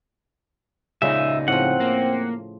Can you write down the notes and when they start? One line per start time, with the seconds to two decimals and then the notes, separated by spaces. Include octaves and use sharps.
1.02 C#2 A#2 C#3 G#3 D#4 E5
1.48 A2 F3 C4 F#5
1.80 A#3